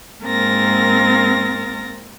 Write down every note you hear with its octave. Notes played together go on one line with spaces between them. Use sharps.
G#2 A#3 C4 A#4 A6 A#6